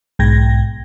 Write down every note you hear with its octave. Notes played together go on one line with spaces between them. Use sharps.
B1 G#2 G5 G#6 A#6